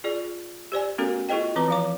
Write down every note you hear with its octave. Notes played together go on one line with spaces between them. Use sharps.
F4 G#4 D5
G4 C5 D5 G#5
A3 B3 C#4 F#4 A4 A#4
E4 F4 G#4 C5 D#5 G5
E3 C4 B4 A#5 D6
F3 F5 D6